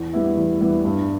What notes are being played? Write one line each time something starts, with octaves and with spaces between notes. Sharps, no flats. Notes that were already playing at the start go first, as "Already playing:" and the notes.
Already playing: E2
E3 G3 B3 E4
E2
E3 G3 B3 E4
G2